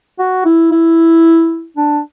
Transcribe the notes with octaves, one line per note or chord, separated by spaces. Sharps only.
F#4
E4
E4
D4